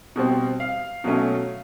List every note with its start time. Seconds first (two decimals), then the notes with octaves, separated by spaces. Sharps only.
0.16 B2 G3 C4
0.60 F5
1.04 B2 F#3 A3 C#4